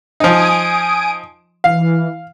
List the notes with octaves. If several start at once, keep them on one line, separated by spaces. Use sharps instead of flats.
F3 D#4 G#5 D#6 D7
E3 F5